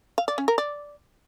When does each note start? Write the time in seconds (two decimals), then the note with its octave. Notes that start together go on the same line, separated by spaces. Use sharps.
0.18 F5
0.28 D5
0.38 C#4
0.48 A#4
0.58 D5